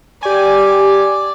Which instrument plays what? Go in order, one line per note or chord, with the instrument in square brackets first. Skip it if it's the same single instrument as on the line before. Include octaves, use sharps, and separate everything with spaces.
[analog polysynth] G4 G#5 [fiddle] D5